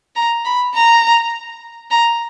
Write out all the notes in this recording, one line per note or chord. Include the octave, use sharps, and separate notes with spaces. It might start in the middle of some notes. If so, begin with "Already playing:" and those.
A#5
B5
A#5
A#5